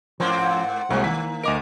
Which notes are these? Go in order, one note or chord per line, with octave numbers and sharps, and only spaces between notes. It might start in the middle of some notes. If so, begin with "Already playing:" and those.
G#2 F3 A#3 C4 C#4 C5
F#5 D7
C2 G#3 A#3 C4 F#4
D#3 B6
D2 A#4 D#5 D6 D7